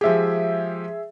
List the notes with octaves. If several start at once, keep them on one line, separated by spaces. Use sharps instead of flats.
F3 G#3 G4 G#4 E5